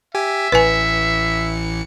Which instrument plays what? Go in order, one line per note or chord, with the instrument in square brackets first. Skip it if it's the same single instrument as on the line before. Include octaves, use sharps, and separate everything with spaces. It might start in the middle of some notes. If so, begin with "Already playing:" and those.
[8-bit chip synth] G4 G#5 [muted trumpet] E5
[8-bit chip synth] A1 E3 C#7 [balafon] B4 G#5